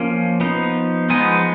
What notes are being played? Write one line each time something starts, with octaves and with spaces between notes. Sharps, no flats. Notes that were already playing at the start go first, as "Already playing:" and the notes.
Already playing: F3 A#3 C#4
F3 B3 D#4
F3 G#3 B3 D#4 G#5